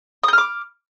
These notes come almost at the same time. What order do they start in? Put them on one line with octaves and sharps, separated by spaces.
D#6 G6 F6 D6